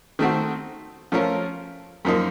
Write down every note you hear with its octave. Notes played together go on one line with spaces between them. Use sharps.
D#3 A3 C4 F#4
F3 A3 C#4 F4 A#4
F#2 F3 A#3 D#4